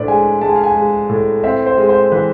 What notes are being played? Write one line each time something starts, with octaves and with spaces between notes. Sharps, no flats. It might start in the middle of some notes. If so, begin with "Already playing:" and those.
Already playing: A2 D4 B4 C5 D5
G#3 G#5
G#3 A5
G#5
F5
G#5
G#3
A2
C4 E5
C5
G#3
C5
E3 B4